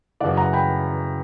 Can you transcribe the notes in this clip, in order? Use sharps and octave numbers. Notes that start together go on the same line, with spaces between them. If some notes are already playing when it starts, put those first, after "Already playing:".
F#2 C#3 E3 D5 F#5
F#5 A#5
G5 B5